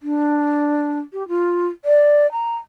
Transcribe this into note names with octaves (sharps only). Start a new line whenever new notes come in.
D4
G4
F4
D5
A#5